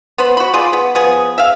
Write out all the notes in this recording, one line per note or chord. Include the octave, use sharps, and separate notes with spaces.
B3 C5 B5
F#4 B5
F4 G#4 D5
B3
F3 B3 G#4
E5 F5